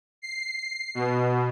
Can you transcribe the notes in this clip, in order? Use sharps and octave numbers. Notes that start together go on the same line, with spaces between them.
C7
B2